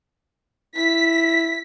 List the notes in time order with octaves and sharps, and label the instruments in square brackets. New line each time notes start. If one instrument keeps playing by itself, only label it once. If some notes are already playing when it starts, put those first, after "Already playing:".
[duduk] E4 [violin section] B6